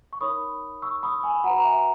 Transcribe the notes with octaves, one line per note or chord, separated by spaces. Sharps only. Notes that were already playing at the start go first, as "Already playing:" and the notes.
C#6
D#4 A#4 C#5 B5 D#6
C#6 E6
B5 D#6
G#5 B5
F#4 B4 F#5 A#5
A#5
E5 G#5